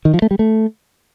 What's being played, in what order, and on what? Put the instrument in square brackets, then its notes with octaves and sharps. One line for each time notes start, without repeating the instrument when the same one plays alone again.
[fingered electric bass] D#3
F3
A3
G3
A3